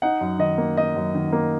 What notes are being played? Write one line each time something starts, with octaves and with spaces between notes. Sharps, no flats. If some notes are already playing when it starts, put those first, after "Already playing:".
D#4 F#5
F#2
D#3 D#5
A#3
D#4 D#5
F#2
D#3
A#3